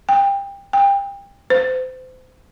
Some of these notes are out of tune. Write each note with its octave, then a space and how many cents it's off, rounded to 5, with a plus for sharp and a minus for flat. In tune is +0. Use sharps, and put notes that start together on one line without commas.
G5 +25
G5 +30
C5 -30